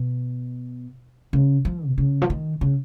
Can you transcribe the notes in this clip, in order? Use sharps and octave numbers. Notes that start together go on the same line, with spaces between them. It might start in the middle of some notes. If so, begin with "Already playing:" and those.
Already playing: B2
C#3
F3
B2
C#3
F3
D#3
C#3